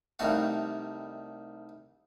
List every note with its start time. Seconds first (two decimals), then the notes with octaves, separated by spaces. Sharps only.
0.19 C2 D#3 G3 A3 F#4 F5